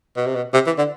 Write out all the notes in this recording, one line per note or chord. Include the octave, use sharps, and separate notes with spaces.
B2
C3
B2
C3
E3
D3